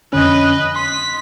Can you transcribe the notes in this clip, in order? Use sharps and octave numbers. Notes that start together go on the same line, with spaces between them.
F2 D3 C#4 B4 D#5
C6 B6